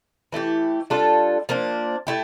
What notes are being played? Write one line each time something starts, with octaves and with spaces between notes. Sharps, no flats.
E3 A3 E4 G4
G3 D4 F4 A4
F3 A#3 D4
A3 E4 G4